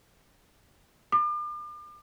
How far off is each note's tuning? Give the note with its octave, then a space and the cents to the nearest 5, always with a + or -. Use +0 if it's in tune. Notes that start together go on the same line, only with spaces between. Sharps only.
D6 +40